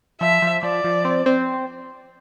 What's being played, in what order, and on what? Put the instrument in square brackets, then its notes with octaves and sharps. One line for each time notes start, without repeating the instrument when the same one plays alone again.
[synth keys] F3 [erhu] E5
[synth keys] F3
[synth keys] F3 [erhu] D5
[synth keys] F3
C4
C4